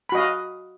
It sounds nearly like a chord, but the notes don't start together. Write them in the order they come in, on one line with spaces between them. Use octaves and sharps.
B5 F#4 D#5 F5